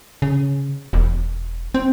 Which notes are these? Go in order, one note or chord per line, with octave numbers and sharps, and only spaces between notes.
C#3
E1
C4